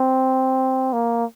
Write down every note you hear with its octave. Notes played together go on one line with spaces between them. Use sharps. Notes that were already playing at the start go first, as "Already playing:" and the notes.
Already playing: C4
A#3